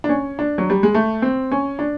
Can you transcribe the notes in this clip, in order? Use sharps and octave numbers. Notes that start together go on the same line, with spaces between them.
D4
C#4
D4
F#3
G3
G#3
A3
C4
C#4
D4